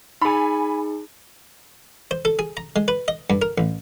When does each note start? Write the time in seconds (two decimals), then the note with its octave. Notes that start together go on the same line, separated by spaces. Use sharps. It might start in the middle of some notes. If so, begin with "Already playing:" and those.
0.22 D#4 G#4 G#5 B5
2.11 C5
2.25 A4
2.39 G#4
2.57 A#5
2.76 G#3
2.88 B4
3.08 D#5
3.30 G2
3.42 A#4
3.58 A1